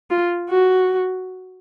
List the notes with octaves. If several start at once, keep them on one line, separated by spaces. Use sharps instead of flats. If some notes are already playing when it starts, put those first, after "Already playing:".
F4
F#4